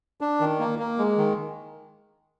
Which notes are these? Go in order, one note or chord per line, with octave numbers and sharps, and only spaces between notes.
D4
D#3
A#3
A#3
G#3
D#3